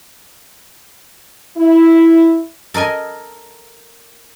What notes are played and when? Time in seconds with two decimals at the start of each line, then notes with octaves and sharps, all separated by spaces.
1.57 E4
2.74 A4 A#4 D#5 G#5